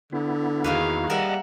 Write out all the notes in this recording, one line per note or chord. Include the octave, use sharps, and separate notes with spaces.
D3 B3 E4
E2 D#3 A#3 E4 F#4 G#4 B4 F5
G3 A#4 D#5 E5 F#5 A5